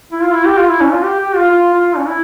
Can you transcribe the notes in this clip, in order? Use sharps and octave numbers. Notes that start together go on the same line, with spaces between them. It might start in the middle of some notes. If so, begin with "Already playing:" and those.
E4
F4
E4
G4
F4
E4
C#4
F4
G4
G4
F4
F4
F4
C#4
E4